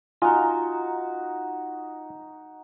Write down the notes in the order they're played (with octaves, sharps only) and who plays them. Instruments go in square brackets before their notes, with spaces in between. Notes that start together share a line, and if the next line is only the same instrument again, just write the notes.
[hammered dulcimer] D#4 F#4 [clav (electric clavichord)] F4 [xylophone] G#5 A#5